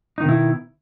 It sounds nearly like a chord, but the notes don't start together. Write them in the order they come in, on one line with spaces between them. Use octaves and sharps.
D#4 D#3 B2 E4